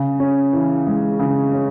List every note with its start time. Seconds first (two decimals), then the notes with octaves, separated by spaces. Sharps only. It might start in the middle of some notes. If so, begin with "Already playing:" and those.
Already playing: C#3
0.20 C#4
0.53 E3
0.87 G#3
1.19 C#3
1.53 C#4